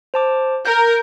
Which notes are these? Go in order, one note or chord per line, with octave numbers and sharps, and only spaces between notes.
C5 A5 D6
A#4 G6